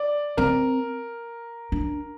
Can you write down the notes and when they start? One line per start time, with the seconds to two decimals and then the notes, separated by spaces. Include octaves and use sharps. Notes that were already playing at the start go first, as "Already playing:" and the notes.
Already playing: D5
0.37 C4 A#4
1.72 D4